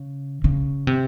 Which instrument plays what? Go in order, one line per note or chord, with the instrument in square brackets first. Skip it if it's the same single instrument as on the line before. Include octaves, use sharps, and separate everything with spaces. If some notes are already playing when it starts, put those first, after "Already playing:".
Already playing: [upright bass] C#3
C#3
C3